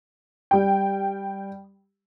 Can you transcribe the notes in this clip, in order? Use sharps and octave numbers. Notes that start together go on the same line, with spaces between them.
G3 G5